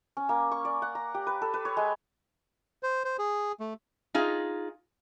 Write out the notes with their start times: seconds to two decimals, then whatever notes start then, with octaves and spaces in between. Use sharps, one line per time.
0.17 C#4
0.29 A#3
0.52 C#6
0.65 D5
0.82 F#5
0.95 A#5
1.14 G4
1.27 B4
1.42 A4
1.54 B4
1.65 C#5
1.77 G#3
2.83 C5
3.04 C5
3.19 G#4
3.60 A3
4.14 D#4 F4 G#4